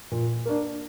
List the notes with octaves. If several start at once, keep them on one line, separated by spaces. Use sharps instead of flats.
A#2
A#3 D4